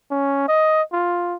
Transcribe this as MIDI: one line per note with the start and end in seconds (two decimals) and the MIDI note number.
0.11 0.48 61
0.48 0.83 75
0.93 1.36 65